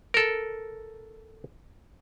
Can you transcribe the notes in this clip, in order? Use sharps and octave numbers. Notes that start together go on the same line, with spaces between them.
A4 A#4